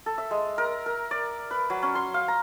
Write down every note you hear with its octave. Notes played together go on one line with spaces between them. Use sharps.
A4
E5
G#3
A#4
A#4
D5
B4
F#3
C#4
C6
F5
A#5